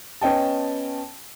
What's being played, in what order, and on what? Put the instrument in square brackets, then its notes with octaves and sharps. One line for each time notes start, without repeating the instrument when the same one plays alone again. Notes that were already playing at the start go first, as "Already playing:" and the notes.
[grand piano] B3 C#4 D#5 G5 A5